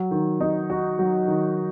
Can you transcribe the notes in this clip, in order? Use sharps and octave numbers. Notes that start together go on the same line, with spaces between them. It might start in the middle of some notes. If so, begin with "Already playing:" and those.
Already playing: F#3
D#3
D#4
F#4
F#3
D#3